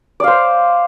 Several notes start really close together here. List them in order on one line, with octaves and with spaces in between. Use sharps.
D5 F5 C5